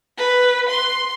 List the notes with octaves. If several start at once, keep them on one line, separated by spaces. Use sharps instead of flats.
B4
C6